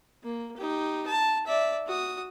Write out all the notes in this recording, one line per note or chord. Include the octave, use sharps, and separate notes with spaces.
A#3
D#4 G4
A5
D5 E5
F#4 D#6